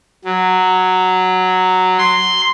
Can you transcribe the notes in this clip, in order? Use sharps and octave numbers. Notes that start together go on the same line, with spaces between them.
F#3
C6